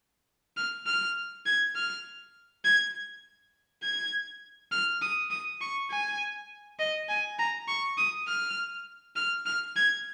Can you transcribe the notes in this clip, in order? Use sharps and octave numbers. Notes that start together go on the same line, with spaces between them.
F6
F6
G#6
F6
G#6
G#6
F6
D#6
D#6
C#6
G#5
D#5
G#5
A#5
C#6
D#6
F6
F6
F6
G#6